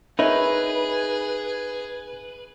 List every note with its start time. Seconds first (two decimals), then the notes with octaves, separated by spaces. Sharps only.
0.19 D#4 G#4 A#4 B4 C#5 E5